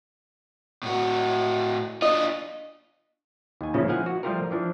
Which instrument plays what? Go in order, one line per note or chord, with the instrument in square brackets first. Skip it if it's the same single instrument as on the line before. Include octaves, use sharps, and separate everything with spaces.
[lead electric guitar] A2 F#4
[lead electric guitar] D4 F4 [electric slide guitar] D#5
[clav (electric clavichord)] D#2 G#5
A#2 C#3 F3 A#3 C#4 E4
F3 A#3 E4 F5 F#5 G#5
F#4
F3 G3 A3 F4 G4 A#4
E3 F3 D4